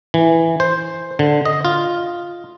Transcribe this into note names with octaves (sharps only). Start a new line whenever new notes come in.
E3
C5
D3
D#5
F4